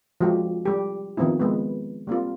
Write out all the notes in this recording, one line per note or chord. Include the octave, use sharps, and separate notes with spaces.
F3 G#3 F#4 G4
G3 G4
D#3 F3 B3 C4 E4
G#3 B3 B4
G3 A#3 C4 F4